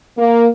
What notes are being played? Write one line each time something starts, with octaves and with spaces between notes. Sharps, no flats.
A#3